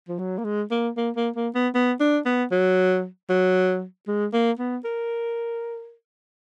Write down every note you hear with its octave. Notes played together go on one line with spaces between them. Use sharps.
F3
F#3
A#3
G#3
A#3
A#3
A#3
A#3
B3
B3
D4
B3
F#3
F#3
G#3
A#3
B3
A#4